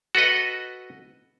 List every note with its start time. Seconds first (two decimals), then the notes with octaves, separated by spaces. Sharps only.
0.15 F#4 A4 B4 D#5